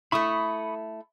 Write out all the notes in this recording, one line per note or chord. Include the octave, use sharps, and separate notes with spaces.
A3 E4 B5 C#6 D#6